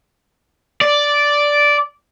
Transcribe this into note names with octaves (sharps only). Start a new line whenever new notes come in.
D5